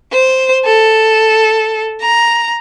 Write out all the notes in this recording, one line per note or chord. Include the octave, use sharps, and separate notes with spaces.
C5
A4
A#5